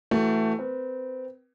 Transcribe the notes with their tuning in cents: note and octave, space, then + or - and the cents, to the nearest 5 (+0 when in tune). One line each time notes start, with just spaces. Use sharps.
E3 +20 A3 +15 F#4 +35
C4 -25 B4 -30